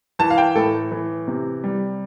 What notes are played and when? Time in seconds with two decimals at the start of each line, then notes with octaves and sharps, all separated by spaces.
0.19 E3 A5
0.30 F5
0.38 G5
0.55 A2 A4
0.92 E3
1.28 C3
1.64 G3